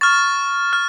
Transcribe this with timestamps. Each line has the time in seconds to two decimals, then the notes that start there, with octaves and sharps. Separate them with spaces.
0.01 C#6 F6 A6
0.73 F6